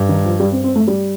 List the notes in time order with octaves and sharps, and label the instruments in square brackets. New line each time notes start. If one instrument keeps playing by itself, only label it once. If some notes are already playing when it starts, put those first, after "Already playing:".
Already playing: [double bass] G2
[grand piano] D#3
F3
G3
C4
C4
A3
G3